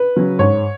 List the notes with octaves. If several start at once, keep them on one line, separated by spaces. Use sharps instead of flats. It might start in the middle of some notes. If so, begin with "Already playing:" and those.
Already playing: B4
C#3 F#3 C#4
G#2 C#5